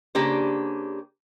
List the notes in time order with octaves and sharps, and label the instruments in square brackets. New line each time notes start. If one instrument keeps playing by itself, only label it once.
[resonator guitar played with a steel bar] C#3 A#3 D4 G4 C5